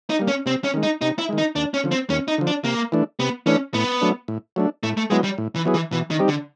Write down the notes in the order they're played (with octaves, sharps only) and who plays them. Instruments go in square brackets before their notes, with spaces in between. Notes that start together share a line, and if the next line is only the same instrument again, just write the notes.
[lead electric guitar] D#4
[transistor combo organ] G3 A#3
[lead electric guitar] C#4
[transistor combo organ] C3 [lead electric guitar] C4
[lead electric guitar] C#4
[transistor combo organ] D#3 G#3
[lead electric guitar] D#4
[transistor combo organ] C3 [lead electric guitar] D#4
[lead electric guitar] E4
[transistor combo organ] D#3 G#3
[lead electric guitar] D#4
[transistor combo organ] D#2 [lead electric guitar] D4
[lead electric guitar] C#4
[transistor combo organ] D3 F3
[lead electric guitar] C4
[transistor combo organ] D#2 [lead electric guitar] C#4
[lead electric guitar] D#4
[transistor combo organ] D3 F3
[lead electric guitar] D4
[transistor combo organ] C3 [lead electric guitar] A#3
[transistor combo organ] E3 A3 D4
[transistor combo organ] C3 [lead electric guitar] B3
[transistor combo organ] E3 A3 D4 [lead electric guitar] C#4
[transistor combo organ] A2 [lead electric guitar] B3
[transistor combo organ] F#3 A3 D4
A2
F#3 A3 D4
[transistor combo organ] A2 [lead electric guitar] A3
[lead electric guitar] A3
[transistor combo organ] F#3 B3 E4 G#4 [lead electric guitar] G#3
[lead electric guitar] G3
[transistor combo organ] A2
[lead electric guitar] E3
[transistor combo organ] F#3 B3 E4 G#4
[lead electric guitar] E3
[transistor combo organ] B2 [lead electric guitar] E3
[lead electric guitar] D#3
[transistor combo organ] G3 C4 D#4 G4
[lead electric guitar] D3